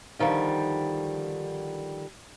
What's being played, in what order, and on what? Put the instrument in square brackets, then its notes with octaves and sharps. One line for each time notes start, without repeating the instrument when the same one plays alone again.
[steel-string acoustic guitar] D3 D#3 F3 G3